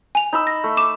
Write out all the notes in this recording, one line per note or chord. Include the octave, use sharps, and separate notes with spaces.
G#5 F7
D#4 B5 E6
A#6
A3
D6 E7